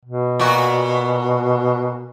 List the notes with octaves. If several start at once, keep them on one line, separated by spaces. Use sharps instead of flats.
B2
A#2 F#4